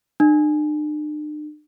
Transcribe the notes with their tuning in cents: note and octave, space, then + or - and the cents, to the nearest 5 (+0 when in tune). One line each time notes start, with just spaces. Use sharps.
D4 +45